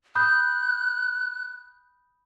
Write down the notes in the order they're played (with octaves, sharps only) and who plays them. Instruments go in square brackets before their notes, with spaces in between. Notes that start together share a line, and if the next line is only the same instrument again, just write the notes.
[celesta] B5 D#6 G6 [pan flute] F#6